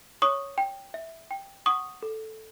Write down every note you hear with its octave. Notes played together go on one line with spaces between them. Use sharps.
C#5 C#6 D#6
G5
E5
G5
F#5 C#6 D#6
A4